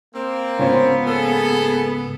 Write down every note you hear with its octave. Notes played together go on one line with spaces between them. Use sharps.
A#3 C4
C#2 G#2 B3 C#4 F4 C5
A#3 G#4 A4